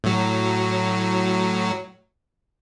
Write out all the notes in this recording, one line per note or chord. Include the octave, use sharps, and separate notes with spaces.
A2 F#3